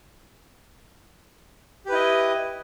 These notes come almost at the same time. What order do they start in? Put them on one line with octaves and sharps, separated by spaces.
G4 B4 E4 D#5